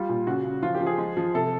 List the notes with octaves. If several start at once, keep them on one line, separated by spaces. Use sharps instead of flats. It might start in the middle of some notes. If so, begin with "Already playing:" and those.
Already playing: G3 F4
A#2
C#3 F#4
C#3
F3 F4
G4
F3
G#4
G#3
F3
C3 A4